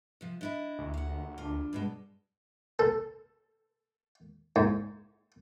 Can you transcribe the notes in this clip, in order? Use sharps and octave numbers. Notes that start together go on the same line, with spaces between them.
C3 F3
D4 E4 D#5
D2
F5 F#5
D4 F4
G2 B2 G#3
A4
G#2